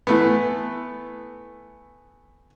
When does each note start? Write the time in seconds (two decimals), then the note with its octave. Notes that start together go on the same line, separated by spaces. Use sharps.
0.07 E3 A3 B3